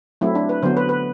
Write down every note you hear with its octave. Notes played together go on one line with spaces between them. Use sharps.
F#3 A3 C4 E4
D4
B4
D3 F#3 B3 C5
B4
B4